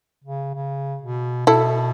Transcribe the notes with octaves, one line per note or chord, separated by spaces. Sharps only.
C#3
C#3
B2
B2 E4 A4